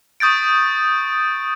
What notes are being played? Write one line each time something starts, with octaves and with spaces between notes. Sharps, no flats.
C#6 D#6 G6 A6 D7